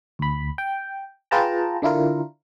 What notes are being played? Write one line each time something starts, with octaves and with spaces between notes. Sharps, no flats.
D2 B5
G5
F4 G#4 B4 G5 A5 A#5
D3 D4 E4 F4 A#4